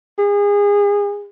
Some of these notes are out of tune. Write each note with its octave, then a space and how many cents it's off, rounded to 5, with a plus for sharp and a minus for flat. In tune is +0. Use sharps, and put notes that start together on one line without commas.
G#4 -30